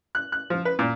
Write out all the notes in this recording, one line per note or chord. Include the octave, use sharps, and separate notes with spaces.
F#6
F#6
F3
B4
A#2